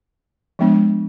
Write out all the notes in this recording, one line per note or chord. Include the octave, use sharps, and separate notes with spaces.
F3 G#3 B3 D4